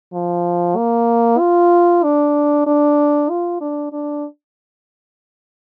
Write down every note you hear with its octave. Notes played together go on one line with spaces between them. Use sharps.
F3
A#3
F4
D4
D4
F4
D4
D4